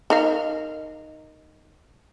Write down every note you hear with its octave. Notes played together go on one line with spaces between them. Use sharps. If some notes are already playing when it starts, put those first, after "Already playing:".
D#4 A#4 F5